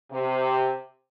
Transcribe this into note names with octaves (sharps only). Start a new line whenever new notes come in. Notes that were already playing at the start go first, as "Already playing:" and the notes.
C3